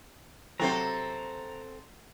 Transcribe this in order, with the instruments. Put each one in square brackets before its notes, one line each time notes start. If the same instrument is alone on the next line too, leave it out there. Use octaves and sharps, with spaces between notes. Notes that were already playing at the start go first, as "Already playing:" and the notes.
[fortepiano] C3 F#3 [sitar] C4 A4 C5 [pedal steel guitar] A#5